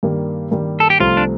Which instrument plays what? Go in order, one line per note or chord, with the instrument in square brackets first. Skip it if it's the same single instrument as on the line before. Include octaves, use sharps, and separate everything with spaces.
[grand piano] G2 D#3 G3 A#3
G2 D#3 G3 A#3
[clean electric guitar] A4
G4
[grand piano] C2 C3 F3 A3 C4 [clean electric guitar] F4
[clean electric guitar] D4